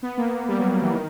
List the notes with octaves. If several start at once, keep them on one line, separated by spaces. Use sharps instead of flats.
B3
A#3
G3
F#3
F#3
E3
D#3